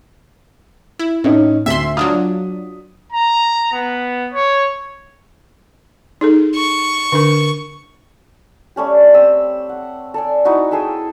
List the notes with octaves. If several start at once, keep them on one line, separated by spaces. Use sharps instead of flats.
E4
A2 C#4 D#4
D2 E5 C6 B6 G7
F#3 D4 F4 D#6
A#5
B3
C#5
D#4 G#4 A4
C#6
D3 D4 A#4
G3 A3 C#4 G4
C4 E5 E6
F#5
A4 D5 G#5
D#4 E4 F#4
G#4 A4 E5 G5